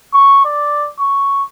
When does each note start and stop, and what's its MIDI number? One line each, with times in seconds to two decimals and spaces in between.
0.14 0.42 85
0.45 0.89 74
0.99 1.44 85